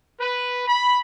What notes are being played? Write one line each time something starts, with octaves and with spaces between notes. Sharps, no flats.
B4
B5